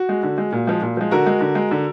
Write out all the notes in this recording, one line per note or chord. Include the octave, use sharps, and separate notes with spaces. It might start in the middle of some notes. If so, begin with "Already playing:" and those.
Already playing: F#4
G#3
D3
G#3
A#2
F3 G#3
A#2
F3 G#3
D3 F#4 A#4
G#3
D3
G#3
D3